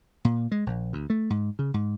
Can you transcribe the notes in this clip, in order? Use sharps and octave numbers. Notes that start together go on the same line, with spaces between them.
A#2
G#3
A#1
D2
A3
G#2
C#3
G#2